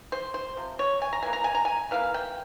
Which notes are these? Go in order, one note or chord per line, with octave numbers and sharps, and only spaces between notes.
C5
C5
C3 F3
C#5
G#5
A#5
E3 A#3 G#5
A#5
G#5
A#5
G#5
E3 A#3 F5
G5